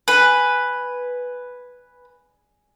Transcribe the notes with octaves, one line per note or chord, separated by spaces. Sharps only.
B4 G#5